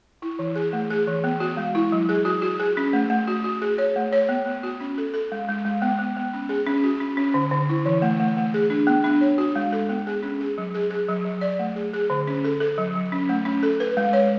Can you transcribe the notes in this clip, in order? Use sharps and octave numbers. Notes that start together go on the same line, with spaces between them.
E4
E3
G#4
A3
G#4
E3
B3
F#4
G#3
E4
F#3
G#4
F#4
F#4
G#4
C#4
A3
A3
F#4
F#4
G#4
C#5
A3
C#5
B3
B3
F#4
C#4
A4
A4
G#3
G#3
G#3
B3
B3
B3
C#4
G#4
C#4
F#4
C#4
C#4
D3
D3
E4
E3
A3
A3
A3
G#4
D4
B3
D4
C#5
F#4
G#3
A4
B3
G#4
C#4
G#4
F#3
G#4
G#4
F#3
F#3
D5
A3
G#4
G#4
D3
C#4
A4
A4
F#3
F#3
C#4
A3
C#4
A4
B4
G#3
C#5